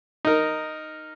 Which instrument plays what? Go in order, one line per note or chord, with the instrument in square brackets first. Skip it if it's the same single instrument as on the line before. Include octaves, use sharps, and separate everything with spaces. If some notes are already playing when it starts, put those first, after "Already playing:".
[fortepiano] D#4 A#4